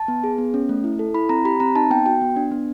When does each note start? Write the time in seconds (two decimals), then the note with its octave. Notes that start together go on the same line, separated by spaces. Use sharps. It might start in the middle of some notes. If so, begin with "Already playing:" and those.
Already playing: A5
0.08 B3
0.24 G#4
0.38 B3
0.54 C#4
0.69 A3
0.84 E4
0.99 A4
1.14 E4 B5
1.29 C4 A#5
1.45 G4 B5
1.60 C4 A#5
1.75 D#4 A5
1.90 B3 G5
2.06 F#4 G5
2.21 B3
2.36 D4
2.52 B3